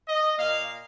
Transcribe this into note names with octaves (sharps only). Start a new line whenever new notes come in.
D#5
A#2 A#3 F5